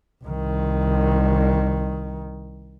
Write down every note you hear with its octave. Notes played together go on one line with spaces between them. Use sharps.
C2 D#3